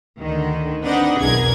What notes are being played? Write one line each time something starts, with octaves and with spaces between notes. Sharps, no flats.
D2 D3 D#3
C4 D4 D#4 B4 D#5 F#5
B1 E2 G#4 A#4 G#6